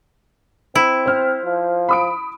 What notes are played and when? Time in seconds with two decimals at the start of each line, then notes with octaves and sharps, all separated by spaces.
0.75 C4 E4
1.06 C5 F6
1.44 F3
1.89 B5 D#6 D7